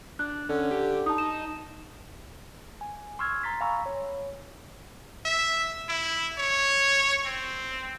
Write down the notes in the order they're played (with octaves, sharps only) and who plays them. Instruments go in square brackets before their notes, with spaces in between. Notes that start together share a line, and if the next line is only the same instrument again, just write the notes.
[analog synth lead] D4 [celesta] F#6
[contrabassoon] D3 [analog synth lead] C#4
[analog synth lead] G4
[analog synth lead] D#4 [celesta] A5 D#6
[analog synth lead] D#4 [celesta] E7
[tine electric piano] G#5
C6 C#6 E6 F6 G#6
A#5 C6 A6 B6
F5 G#5 A#5 B5 C#6 E6
C#5
[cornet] E5
E4
C#5
C4